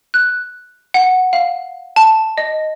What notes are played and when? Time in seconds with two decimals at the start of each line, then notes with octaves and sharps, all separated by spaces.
0.14 F#6
0.94 F#5
1.33 F5
1.96 A5
2.38 D#5